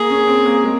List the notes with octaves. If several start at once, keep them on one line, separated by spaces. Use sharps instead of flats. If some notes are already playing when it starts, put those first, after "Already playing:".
Already playing: A#3 G#4
C#4
C4
A#3
G#3